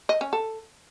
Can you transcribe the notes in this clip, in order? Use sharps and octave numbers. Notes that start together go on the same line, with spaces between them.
D#5
C#4
A4